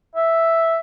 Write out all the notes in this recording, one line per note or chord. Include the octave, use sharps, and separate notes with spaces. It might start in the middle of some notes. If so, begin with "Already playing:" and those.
E5